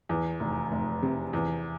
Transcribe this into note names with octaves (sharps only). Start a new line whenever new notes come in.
E2
F1
F1
C3
E2